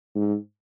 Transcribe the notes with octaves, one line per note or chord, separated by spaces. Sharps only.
G#2